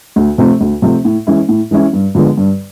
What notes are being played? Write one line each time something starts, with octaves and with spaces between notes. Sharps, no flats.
D2
C3 F3 A3 C4
D2
C3 F3 A3 C4
A2
E3 G#3 C#4 E4
A2
E3 G#3 C#4 E4
G2
D3 F3 G#3 B3
G2